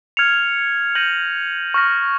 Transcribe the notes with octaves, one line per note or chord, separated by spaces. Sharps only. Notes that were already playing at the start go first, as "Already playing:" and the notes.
F6 G#6 C#7 F7
G6 A#6 D#7 F#7
C#6 F6 A#6